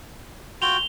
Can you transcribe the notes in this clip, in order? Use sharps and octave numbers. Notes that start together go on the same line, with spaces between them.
F4 F#4 G5 F7 G7